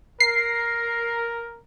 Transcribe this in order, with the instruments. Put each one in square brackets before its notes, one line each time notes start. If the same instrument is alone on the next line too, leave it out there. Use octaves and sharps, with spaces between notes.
[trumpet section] A#4 [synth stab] C7